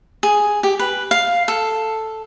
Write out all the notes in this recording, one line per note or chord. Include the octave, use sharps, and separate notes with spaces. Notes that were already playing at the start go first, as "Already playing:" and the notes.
G#4
G4
B4
F5
A4